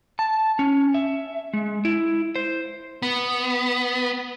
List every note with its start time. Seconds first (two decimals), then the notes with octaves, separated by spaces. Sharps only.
0.19 A5
0.59 C#4
0.94 E5
1.53 G#3
1.85 E4
2.36 C5
3.02 B3